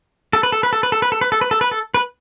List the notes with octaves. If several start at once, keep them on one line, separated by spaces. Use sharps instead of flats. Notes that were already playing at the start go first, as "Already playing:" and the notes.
A4
B4
A4
B4
A4
B4
A4
B4
A4
B4
A4
B4
A4
B4
A4
B4